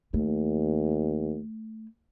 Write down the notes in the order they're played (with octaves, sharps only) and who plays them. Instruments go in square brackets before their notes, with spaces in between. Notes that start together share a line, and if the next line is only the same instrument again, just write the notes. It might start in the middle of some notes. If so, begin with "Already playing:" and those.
[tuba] D#2 [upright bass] A3